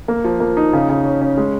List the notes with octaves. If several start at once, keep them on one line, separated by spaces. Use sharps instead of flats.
A#3
F3
A#3
D#4
C#3
C#3
C#4
C#4
G#3